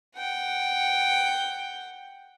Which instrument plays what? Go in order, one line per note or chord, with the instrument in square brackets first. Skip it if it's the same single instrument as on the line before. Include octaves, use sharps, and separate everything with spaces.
[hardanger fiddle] F#5 G5